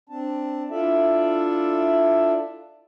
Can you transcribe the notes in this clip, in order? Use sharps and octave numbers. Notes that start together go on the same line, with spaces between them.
C4 D4 A5
D4 E4 F4 A4 D5 E5